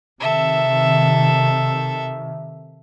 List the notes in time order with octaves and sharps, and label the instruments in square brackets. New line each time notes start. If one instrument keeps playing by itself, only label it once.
[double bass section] C3 D#3 [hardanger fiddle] A4 E5